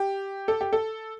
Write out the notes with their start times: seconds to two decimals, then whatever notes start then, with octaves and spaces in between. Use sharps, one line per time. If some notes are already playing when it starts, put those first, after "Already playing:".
Already playing: G4
0.48 A4
0.61 G4
0.73 A4